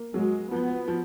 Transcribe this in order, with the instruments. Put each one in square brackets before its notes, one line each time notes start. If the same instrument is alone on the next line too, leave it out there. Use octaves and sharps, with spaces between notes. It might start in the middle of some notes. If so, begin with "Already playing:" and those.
Already playing: [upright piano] A#3
[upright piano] F#3 [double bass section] G#3
[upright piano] F3 [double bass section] B3
[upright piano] F3